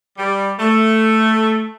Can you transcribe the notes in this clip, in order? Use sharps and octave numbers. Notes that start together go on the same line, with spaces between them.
G3
A3